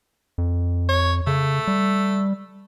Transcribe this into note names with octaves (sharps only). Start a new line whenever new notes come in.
F2
C#5
C#3 A3
G3